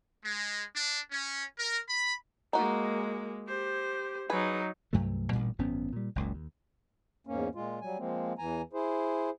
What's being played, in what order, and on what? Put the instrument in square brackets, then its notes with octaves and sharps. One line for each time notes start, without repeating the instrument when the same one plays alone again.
[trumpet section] G#3
D4
C#4
A#4
B5
[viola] G#3 A#3 [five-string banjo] D#4 F#4
[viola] G4 C5
[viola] F#3 D#4 [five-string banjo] G#4 B4
[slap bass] C2 G2 F#3 A3
A1 G2 A#2 G3
G#1 F#2 B3 C#4
A#2 G3
F#1 C#2 A#2
D#2
[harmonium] E2 G#2 A#3 C#4
A#2 G#3 F4
F#3 G3 G#5
F3 G#3 A#3 C4
E2 E3 G#5 A#5
E4 G#4 C5